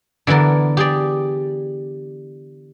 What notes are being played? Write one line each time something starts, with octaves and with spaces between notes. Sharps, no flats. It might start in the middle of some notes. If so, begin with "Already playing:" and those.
D3 E3 B3 A4 A#4
G4 G#4 D5